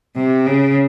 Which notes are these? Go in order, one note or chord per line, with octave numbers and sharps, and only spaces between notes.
C3
C#3